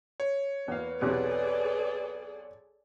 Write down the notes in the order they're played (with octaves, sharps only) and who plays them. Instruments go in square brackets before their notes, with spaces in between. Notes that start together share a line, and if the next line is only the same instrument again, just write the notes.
[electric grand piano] C#5
[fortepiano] E2 F5 [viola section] A#3 [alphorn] B4
[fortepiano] B1 E2 C3 [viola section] G#4 A4 D5